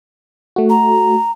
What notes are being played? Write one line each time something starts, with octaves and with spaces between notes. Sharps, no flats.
A3 F#4
A#5